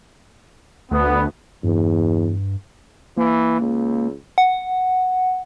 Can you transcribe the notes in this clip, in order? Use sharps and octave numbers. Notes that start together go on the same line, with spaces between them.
D2 B3
E2 G2
E3 A#3
C#2
F#5